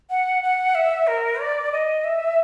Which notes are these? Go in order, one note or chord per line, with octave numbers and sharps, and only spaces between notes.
F#5
F#5
E5
A#4
D5
D#5
E5